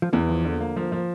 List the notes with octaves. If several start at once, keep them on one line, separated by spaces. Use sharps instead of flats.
F3
E2 E3
F3
D3
A#3
F3
F3